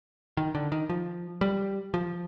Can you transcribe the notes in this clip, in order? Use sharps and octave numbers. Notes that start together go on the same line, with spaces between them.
D#3
D3
D#3
F3
G3
F3